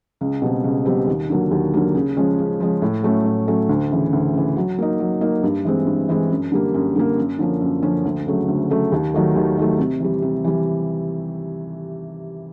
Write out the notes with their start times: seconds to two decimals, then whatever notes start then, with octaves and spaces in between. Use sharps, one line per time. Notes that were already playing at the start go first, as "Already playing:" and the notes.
0.21 C#2
0.42 B2 G3 C4
0.64 C#2
0.86 B2 G3 C4
1.07 D#2
1.30 D3 F#3 A#3
1.51 D#2
1.74 D3 F#3 A#3
1.95 C#3
2.17 F3 G#3 C#4
2.39 C#3
2.60 F3 G#3 C#4
2.82 A2
3.03 F#3 A3 C#4
3.26 A2
3.48 F#3 A3 C#4
3.69 D2
3.91 C#3 E3
4.13 D2
4.34 C#3 E3
4.57 F#3
4.79 A#3 D#4
5.00 F#3
5.21 A#3 D#4
5.43 G2
5.65 E3 G#3 C4
5.87 G2
6.09 E3 G#3 C4
6.30 F#2
6.52 D3 G3 A#3
6.74 F#2
6.95 D3 G3 A#3
7.17 F#2
7.39 D3 F3 A#3 C#4
7.61 F#2
7.82 D3 F3 A#3 C#4
8.05 D2
8.26 C#3 F#3 A3
8.48 D2
8.70 C#3 F#3 A3
8.92 D#2
9.14 D#3 F#3 A3
9.36 D#2
9.58 D#3 F#3 A3
9.78 C3
10.00 E3 G3
10.22 C3
10.45 E3 G3